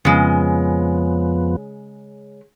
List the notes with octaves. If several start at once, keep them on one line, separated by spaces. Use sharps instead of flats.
F2 C#3 F3 G#3 B3